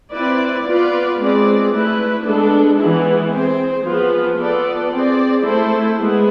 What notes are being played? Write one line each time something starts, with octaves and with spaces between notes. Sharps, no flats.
C4 E4 B4 D5
B3 F4 B4 D5
G#3 C4 G#4 B4 D5
A3 E4 B4
G#3 B3 D4 A4
E3 G#3 B3 E4 G#4
C4 G#4 C5
F3 B3 F4 G#4
B3 F4 A4 D5
C4 G#4 D5
A3 E4 A4 C5
G#3 B3 E4 G#4